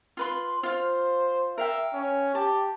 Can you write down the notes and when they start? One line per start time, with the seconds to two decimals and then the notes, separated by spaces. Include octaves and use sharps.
0.17 F4 B4 C6
0.63 F4 C5 F5
1.58 A#4 E5 F5 G5
1.94 C#4
2.35 G4 A5